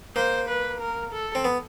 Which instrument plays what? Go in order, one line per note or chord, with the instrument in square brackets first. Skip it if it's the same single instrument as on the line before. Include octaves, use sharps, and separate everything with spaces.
[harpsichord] A#3 [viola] C5
[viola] B4
A#4
A4
[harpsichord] C4
B3